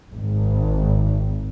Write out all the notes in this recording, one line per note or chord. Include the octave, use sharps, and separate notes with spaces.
G#1